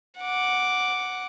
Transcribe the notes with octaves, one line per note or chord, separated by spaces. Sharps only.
F#5 D6